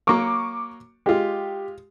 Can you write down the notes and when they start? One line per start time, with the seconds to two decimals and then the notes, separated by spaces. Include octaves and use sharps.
0.07 F#3 A#3 C#6 D6
1.06 G#3 F4 G4